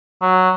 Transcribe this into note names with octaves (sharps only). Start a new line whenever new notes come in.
F#3